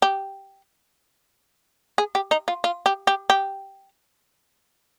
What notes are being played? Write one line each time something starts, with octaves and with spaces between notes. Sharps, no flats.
G4
G#4
G4
D#4
F4
F4
G4
G4
G4